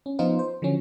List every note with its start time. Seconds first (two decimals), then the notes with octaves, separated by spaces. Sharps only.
0.06 C#4
0.19 F3 B3 D#4 F4 C5
0.39 C5
0.62 D3 F3 F#3 C#4